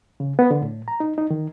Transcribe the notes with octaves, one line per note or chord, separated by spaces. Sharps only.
C#3
B3
D3
A2
A#5
D#4
D#4
D#3